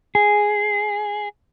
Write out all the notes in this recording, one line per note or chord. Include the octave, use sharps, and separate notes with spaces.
G#4